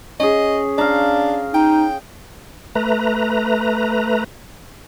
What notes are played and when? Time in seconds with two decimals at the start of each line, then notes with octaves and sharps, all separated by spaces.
0.20 C#4 G#4 D#5
0.78 D4 F5 A#5
1.54 D#4 G5
2.75 A3 B4 A#5